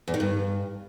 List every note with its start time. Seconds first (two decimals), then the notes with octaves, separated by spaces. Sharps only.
0.08 E2
0.14 D#3
0.20 G2